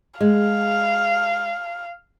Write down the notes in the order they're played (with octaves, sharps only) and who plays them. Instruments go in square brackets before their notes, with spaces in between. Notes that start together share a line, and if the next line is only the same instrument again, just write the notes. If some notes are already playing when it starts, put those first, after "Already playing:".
[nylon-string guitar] G#3 [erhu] F5